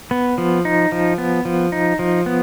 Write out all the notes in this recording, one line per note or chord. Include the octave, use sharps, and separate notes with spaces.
B3
F3
D#4
F3
B3
F3
D#4
F3
B3